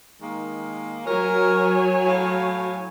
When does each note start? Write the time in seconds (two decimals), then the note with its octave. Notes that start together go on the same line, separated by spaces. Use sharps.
0.21 D#3 G#3 A#3
1.06 F#3 A#4 C#5 G#5
2.06 A2 F5